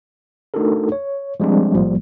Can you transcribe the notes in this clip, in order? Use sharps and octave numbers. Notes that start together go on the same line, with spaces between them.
A3 D4 D#4 F#4 A4 A#4
C#5
F3 G3 G#3 C4 D4
B1 A2 F3 G3 A#3